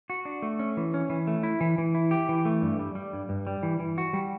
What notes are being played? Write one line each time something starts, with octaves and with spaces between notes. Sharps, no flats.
F#4
D4
A3
C#4
E3
C#4
E3
A3
E4
E3
E3
E4
G4
E3
A3
G2
G3
G3
G2
G2
G3
E3
E3
F#4
G3